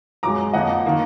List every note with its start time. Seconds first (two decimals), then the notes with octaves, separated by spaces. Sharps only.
0.23 F#2 F3 G#3 A#5 D6
0.53 F2 F3 A#3 D#5 F#5
0.86 D#3 A#3